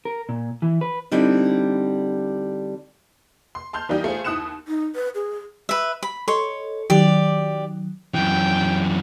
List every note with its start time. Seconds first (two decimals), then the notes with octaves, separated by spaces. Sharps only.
0.05 A#4
0.29 A#2
0.62 E3
0.81 B4
1.11 D3 G3 C4 D#4 E4
3.55 C6
3.73 A5 C6 F6 G6
3.89 E3 G3 A#3 D4 D#4 G4
4.04 A3 F4 G#4 C5
4.24 D#2 E4 D#6 F#6 C#7 E7
4.68 D#4
4.95 B4
5.15 G#4
5.69 B4 E5
6.03 B5
6.28 A4 C#5 D#5 C6
6.90 D#3 F#3 G4 D5
8.14 F#2 E3 G5